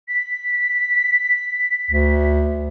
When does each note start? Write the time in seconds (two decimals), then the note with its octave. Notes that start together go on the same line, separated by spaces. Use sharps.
0.08 B6
1.91 D2